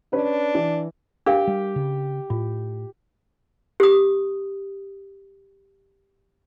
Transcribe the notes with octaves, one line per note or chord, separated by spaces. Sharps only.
C#4 D4 B4
E3
D4 G4 A#4 F5
G3
C#3
A2 F4
G4 D#6